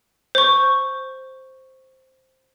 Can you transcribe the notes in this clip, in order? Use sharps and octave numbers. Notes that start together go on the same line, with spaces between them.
C5 C#6